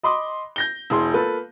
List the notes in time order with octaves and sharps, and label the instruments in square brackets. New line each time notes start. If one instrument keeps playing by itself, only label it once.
[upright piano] D#5 B5 C6 D6 D#6
G6 A#6 G7
E1 E3 G#4 C6
A#3 F4 A4 B4